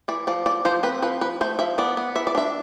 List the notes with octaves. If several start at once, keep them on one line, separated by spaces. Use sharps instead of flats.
E3 D5
F3 D5
F3 D5
F3 C5
C4 B4
F3 B4
F3 B4
A3 C5
F3 E5
B3 D5
B3
E3 E5
D5
D4 E5